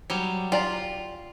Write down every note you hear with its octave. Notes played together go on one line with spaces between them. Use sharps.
F#3 G3
F4 G4 D5 A#5